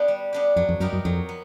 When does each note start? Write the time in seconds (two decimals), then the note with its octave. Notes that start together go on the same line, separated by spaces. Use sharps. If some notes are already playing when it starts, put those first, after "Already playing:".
Already playing: B3 D4 G4
0.08 G3
0.33 B3 D4 G4
0.56 F2 F#3
0.69 F2
0.80 F#2 B3 D#4 G4 A#4
0.93 F#2
1.05 F2 F#3
1.29 B3